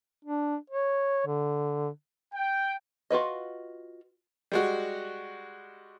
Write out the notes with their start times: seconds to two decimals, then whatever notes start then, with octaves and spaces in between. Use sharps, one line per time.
0.25 D4
0.70 C#5
1.27 D3
2.34 G5
3.10 F4 F#4 B4 D#5
4.52 G3 G#3 F#4